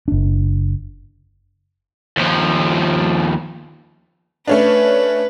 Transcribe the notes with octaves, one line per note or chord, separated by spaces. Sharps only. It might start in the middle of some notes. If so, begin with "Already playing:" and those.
F#1 D4
D#2 F3
A3 C#4 D4 B4